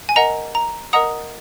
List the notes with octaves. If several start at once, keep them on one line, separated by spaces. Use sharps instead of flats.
G#5
A#4 D#5 F#5 A#5
A#5
A#4 D#5 F#5 A#5 D#6